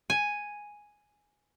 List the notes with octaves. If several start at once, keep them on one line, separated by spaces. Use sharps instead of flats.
G#5